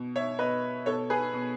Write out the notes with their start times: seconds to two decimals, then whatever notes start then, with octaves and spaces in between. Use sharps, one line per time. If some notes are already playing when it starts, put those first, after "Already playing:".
Already playing: B2
0.16 C#5 E5
0.39 B2 B4 D#5
0.86 B2 A4 C#5
1.10 G#4 B4
1.33 B2